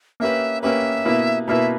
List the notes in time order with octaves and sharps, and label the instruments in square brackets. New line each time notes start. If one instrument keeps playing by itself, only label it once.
[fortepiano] A#3 C#4 G4 B4 [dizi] E5
[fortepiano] A#3 C#4 G4 B4 [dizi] E5
[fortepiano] B2 A#3 E4 B4
[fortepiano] B2 A#3 E4 B4 [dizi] E5